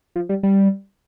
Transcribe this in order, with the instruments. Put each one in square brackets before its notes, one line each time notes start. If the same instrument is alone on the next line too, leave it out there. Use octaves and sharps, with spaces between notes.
[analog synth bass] F3
G3
G3